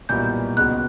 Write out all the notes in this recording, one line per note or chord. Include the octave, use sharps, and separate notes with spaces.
B1 A#2 G3 B3 E4 G6
C#2 B2 G#3 B3 F#6